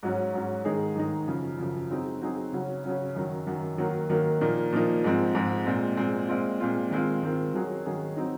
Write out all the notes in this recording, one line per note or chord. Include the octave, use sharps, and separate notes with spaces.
G#2 F#3 C#4
G#2 F#3 C#4
G#2 D#3 G#3 D#4 G#4
G#2 D#3 G#3 D#4 G#4
F#2 C#3 F3
F#2 C#3 F3
F#3 C4 D#4 G#4
F#3 C4 D#4 G#4
C#3 F#3 C#4
C#3 F#3 C#4
F#2 D#3 F#3
F#2 D#3 F#3
D#3 F#3 A#3
D#3 F#3 A#3
A#2 F3 A#3 D#4
A#2 F3 A#3 D#4
G#2 F3 G#3 C4
G#2 F3 G#3 C4
A#2 G#3 C4
A#2 G#3 C4
A#2 G#3 C4 F4
A#2 G#3 C4 F4
D#3 G#3 C4 F4
D#3 G#3 C4 F4
D#3 F#3 C#4 G#4
D#3 F#3 C#4 G#4
F#3 C4 D#4